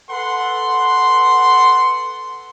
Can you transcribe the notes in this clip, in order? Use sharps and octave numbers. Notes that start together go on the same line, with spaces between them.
A4 B4 F#5 C6